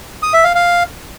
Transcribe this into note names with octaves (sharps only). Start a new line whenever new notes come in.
D#6
E5
F5
F5